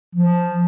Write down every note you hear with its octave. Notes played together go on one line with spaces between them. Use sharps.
F3